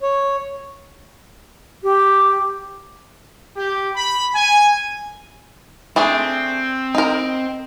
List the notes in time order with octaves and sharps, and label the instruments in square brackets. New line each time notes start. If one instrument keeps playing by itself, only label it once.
[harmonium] C#5
[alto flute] G4
[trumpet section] G4
B5
G#5
[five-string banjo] A3 D4 G#4 [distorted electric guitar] C4
[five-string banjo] D#4 A#4